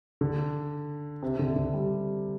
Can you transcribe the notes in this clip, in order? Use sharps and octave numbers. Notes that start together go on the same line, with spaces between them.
D3
C3
C3
D3
D3
G3